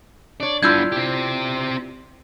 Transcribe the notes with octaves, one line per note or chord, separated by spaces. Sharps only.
D4 C#5 D5
G2 B3 D4 E4 F4 E6 G6 G#6
C4 G4